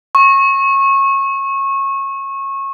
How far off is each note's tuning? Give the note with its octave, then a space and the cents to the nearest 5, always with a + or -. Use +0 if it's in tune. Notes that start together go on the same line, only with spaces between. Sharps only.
C#6 -25